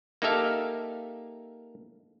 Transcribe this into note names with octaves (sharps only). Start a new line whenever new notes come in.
A#3 D#4 G4 A4 E5 F5